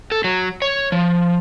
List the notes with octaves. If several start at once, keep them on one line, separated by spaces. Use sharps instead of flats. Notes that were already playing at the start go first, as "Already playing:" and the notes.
A4
F#3
C#5
F3